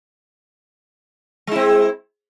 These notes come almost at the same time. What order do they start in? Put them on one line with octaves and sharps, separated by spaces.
G#3 E4 C4